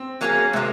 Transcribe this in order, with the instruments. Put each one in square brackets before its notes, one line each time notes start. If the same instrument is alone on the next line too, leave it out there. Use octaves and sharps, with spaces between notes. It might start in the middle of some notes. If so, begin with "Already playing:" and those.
Already playing: [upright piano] C4
[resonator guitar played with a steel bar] F#3 A#3 C#4 G#4
[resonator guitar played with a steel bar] C3 F#3 A#3 [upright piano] G#3